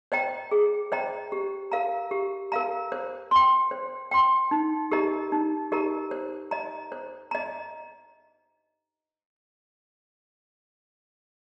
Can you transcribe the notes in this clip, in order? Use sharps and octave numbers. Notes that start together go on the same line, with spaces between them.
C5 D#5 G5 A#5
G#4
C5 D#5 G5 A#5
G4
A#4 F5 A#5
G4
A#4 F5 A#5
C5
G5 C6
C5
G5 C6
D#4
G4 A#4 D#5 A#5
D#4
G4 A#4 D#5 A#5
C5
D#5 A#5
C5
D#5 A#5